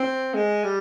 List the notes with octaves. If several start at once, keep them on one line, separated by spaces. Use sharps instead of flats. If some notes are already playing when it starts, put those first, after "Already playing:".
Already playing: C4
G#3
G3